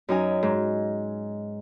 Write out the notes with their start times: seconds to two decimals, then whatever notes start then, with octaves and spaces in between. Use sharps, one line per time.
0.08 F#2 D#4 G#5
0.43 G#2